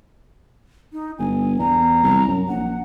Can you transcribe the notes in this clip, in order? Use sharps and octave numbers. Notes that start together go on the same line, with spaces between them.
D#4
G1 G#5
E2 A#5
C2
F#2
A#1 F#5